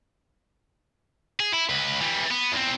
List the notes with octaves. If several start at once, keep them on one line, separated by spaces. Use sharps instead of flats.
G#4
E4
C#2 B4
E3 G3
B3
E2 C4